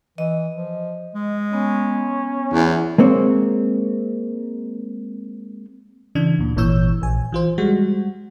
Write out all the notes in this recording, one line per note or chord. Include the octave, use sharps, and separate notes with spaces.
E3 D#5
F3
G#3
B3 C#4
E2 E4
G#3 A#3 C4 C#5
C#3 E3 D4 G#6
D2 A#2
G#1 A#2 E3 C#5 E6 G6
A#1 G#5
E3 F4 C5
G3 G#3 F#4